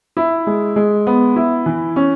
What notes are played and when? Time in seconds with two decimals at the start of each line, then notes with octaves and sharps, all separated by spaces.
0.17 E4
0.47 G#3
0.76 G#3
1.07 B3
1.36 E4
1.66 E3
1.96 C#4